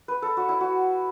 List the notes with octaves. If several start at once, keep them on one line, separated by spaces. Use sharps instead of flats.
B4
A4
F#4
E4
F#4